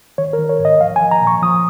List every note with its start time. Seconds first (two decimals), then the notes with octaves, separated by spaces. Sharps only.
0.18 D#3 C#5
0.33 A#4
0.39 D#3
0.49 C#5
0.59 G#2
0.65 D#5
0.80 F3 F5
0.96 G#5
1.01 F3
1.11 A#5
1.22 A#2
1.27 C#6
1.42 F3 D#6